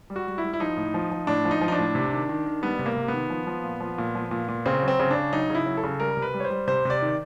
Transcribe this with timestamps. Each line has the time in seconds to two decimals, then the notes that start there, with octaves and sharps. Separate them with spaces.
0.10 G3
0.16 F#4
0.27 G3
0.38 E4
0.44 G3
0.53 E4
0.60 F3 D#4
0.77 A2
0.94 F3
1.11 F3
1.27 A2 D4
1.45 F3
1.51 D#4
1.61 F3
1.68 D#4
1.72 D4
1.78 A2
1.95 C3
2.13 D#3
2.29 D#3
2.46 D#3
2.62 G3 B3
2.79 C3
2.86 A#3
2.97 C3
3.08 B3
3.13 D#3
3.30 F3
3.47 F3
3.64 A#2
3.81 F3
3.98 A#2
4.15 F3
4.31 A#2
4.48 A#2
4.66 C#3 C4
4.82 F#3
4.88 C4
5.00 C#3
5.11 C#3 D4
5.33 F#3 D#4
5.50 C#3 E4
5.66 F#3
5.77 A4
5.84 C#3
6.00 G3 A#4
6.17 C3
6.22 B4
6.34 G3
6.40 C#5
6.45 C5
6.50 G3
6.67 C3 C5
6.85 C3 D5
7.02 D#3